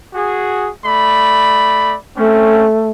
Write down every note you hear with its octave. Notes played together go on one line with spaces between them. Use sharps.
F#4 G#4
A3 D5 B5
A3 C4 C#4